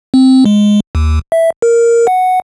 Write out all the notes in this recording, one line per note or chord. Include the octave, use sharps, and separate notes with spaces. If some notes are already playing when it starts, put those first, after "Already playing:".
C4
G#3
D#2
E5
A#4
F#5